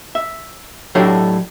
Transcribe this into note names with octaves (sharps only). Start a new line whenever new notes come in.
E5
A2 F#3 A3 D4 F#4 G4